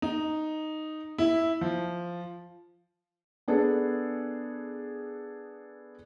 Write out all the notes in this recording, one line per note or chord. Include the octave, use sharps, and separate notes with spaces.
D#4
E4
F3
B3 D4 G#4 A4 B4